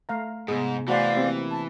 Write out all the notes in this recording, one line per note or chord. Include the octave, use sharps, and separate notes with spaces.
A3 F5 A#5
G#2 C3 B3 G#4 D#6
E3 A3 F#4 C5 D5 F5 F#5 G#5
A#3 C4 G4
A5